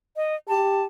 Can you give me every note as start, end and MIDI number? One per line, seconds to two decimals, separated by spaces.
0.16 0.36 75
0.48 0.85 67
0.48 0.84 81